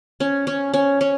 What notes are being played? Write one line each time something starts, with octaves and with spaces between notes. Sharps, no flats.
C#4
C#4
C#4
C#4